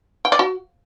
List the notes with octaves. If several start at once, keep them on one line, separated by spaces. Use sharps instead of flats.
G5
D5
F#4